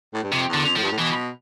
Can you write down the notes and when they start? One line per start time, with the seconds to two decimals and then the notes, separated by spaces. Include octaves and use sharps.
0.14 A2
0.23 G2
0.32 F2 C3
0.49 E2
0.54 D3
0.66 F2
0.77 A2 F3
0.82 G2
0.92 A2
0.98 B2 E3